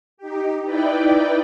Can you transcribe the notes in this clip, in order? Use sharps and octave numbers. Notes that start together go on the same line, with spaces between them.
D#4 G4
D#4 E4 B4 D5 G5